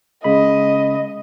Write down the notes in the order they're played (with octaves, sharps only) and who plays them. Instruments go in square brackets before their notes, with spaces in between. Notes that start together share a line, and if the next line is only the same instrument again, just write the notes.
[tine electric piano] C#3 G#3 B5 [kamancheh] D#5